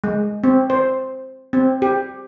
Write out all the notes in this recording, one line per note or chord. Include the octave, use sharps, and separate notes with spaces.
G#3
C4
C5
C4
G4